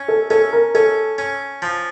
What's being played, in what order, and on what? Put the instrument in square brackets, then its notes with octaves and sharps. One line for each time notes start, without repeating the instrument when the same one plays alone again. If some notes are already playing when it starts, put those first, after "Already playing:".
Already playing: [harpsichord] C#4
[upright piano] A4
[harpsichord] C#4 [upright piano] A4
[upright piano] A#4
[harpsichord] C#4 [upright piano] A4
[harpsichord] C#4
F3